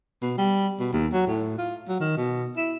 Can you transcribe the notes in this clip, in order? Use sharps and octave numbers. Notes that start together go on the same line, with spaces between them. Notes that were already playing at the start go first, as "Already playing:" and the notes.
B2
G3
B2
D#2
F#3
A2
F4
F#3
D#3
B2
E4